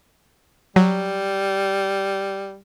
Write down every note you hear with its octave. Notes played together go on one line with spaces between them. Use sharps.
F#3 G3